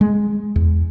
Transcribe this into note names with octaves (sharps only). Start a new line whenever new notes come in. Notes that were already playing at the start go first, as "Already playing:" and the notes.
G#3
E2